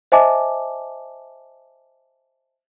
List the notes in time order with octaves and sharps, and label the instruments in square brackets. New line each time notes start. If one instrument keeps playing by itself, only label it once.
[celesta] C5 D#5 E5 G#5 A5 D6